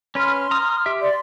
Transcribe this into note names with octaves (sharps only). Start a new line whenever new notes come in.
C#4 B4 C6 F6
A#5 D#6
G4 E5
D5 C6